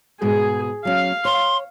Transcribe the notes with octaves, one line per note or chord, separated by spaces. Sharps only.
G#2 B2 G#4
F#3 C#4 F5
C#5 C6